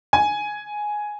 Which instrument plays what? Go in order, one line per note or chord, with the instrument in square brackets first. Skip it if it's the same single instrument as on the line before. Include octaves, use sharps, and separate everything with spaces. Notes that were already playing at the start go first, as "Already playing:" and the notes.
[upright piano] G#5